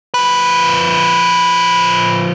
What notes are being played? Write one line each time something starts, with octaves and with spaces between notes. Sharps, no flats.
F3 B4